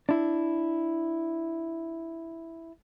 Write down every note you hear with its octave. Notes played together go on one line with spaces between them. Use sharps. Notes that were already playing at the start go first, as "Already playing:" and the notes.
D4 E4